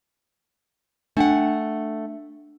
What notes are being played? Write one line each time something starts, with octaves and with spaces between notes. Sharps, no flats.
A3 D4 F#5 G5